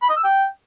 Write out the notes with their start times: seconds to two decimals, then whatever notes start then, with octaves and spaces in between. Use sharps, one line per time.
0.02 B5
0.09 D#5
0.17 E6
0.24 G5